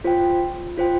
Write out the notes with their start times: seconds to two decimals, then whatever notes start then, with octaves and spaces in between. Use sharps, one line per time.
0.04 F4 C5 G5
0.77 F4 C5 G5